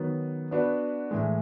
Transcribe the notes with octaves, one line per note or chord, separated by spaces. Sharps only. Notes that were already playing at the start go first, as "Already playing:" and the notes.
Already playing: D#3 F#3 B3
B3 D4 F#4 B4
A2 E3 G#3